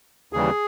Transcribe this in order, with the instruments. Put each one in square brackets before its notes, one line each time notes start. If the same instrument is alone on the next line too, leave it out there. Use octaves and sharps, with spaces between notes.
[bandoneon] D#2 C#3 E3 G3 G#4